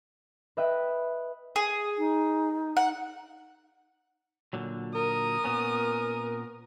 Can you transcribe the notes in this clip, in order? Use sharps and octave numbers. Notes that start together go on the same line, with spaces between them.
B4 D#5 E5 G5
G#4
D#4
F#5
A#2 D3 F#3
A#4 D#6
A#2 B3 C#4